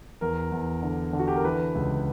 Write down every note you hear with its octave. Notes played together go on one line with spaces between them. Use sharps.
E2 A#4
E2
D3
D3
F#4
G4
A#4
E3 B4
C#2